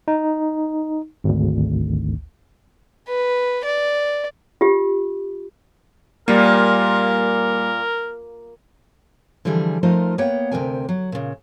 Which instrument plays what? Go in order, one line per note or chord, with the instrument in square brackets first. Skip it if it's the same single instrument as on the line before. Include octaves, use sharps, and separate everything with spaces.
[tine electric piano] D#4
G#1 D2
[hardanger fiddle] B4
D5
[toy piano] F4 G4
[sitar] A#2 [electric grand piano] G3 A#3 [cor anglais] A#4
[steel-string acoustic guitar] D3 E3 F3 G3 G#4
F3 A3 D#4 F4 A#4 D#5
A#3 B3 C#5 F#5 G5
D2 C3 G#3 A#4 G5 G#5
F#3
A#2 C#3